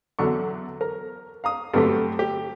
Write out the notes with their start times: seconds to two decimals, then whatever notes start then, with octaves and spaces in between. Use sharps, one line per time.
0.19 E2 D3 F#3 A4 C#6
0.81 A#4
1.44 F5 A#5 D#6
1.74 G2 D3 F#3 A3 C4 G4
2.19 G4